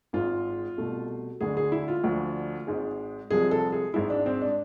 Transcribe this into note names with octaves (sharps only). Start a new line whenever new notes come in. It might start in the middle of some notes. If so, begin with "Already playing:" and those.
G#1 G#2 G#3 F4
C2 B2 A3
D2 D3 G#3 G#4
G#4
E4
F4
D2 D3 F3
G#1 G#2 G#3
C2 C3 F3 G#3 G#4
A4
G#4
G#1 G#2 G#3 E4
D4
C4
D4